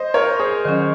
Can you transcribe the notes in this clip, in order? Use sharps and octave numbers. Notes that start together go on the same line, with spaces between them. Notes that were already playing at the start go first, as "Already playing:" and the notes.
Already playing: C5 D#5
A#4 C#5
G#4 C5
D#3 F#3 C#4